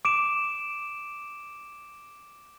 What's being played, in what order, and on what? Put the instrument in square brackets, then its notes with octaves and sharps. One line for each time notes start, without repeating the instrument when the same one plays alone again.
[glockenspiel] D6 D7 E7